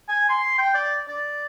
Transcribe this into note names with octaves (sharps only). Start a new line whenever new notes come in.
G#5
C6
G5
D5
D5